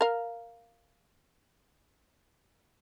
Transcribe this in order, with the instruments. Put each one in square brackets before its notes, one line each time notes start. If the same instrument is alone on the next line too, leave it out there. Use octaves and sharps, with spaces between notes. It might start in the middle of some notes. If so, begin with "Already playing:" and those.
[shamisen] A#4 F5